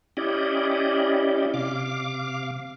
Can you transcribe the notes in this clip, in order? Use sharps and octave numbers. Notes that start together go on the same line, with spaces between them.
C#4 E4 G4 D5 D#5
C3 F5 D6